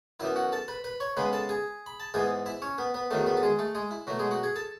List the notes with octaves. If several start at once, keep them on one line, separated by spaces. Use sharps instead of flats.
F#2 E3 B3 E4 E5
F#4 F#5
A4 A5
B4 B5
B4 B5
C#5 C#6
C#3 G#3 B3 B4 B5
A4 A5
G#4 G#5
B5
A5
G#2 E3 B3 G#4 G#5
E4 E5
C#4 C#5
B3 B4
B3 B4
E2 D#3 F#3 A3 B3 A4
B3 B4
A4
G#3 G#4
A3 A4
G#3 G#4
E4
B2 F#3 A3 F#4
G#3 G#4
F#4 F#5
G#4 G#5
A4 A5